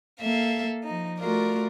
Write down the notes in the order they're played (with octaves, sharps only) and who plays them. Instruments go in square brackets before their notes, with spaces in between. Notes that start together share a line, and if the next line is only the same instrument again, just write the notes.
[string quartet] A#3 A4 E5 F5
F3 D#4
A3 F4 F#4 A#4 D5